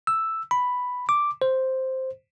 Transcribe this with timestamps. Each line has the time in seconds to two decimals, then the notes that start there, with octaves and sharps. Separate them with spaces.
0.07 E6
0.51 B5
1.09 D6
1.42 C5